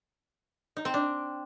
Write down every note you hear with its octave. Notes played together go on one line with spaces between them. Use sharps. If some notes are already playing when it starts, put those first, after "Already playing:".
D#4
C4
D4